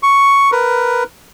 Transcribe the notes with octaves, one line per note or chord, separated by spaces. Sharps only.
C#6
A#4 B4